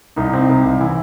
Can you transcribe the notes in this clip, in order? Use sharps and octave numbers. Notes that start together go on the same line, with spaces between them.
C2 D#4
C4
C2
C2
E3 E4